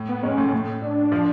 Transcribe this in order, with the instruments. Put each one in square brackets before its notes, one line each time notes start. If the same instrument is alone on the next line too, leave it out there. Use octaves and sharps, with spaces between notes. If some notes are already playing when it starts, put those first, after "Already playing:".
Already playing: [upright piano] A2
[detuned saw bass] B3
[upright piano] G#2 G#3 [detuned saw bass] C#4
[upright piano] A2 A3
A2 A3
[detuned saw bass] D4
[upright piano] F3 F4